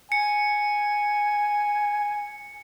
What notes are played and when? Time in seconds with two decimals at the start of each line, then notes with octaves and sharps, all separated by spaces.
0.12 G#5 C#7